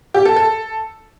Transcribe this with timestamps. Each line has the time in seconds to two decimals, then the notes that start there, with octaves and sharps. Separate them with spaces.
0.14 G4
0.25 A4
0.36 A4